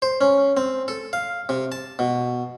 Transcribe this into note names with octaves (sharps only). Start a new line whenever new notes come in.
C5
C#4
C4
A4
F5
C3
A5
B2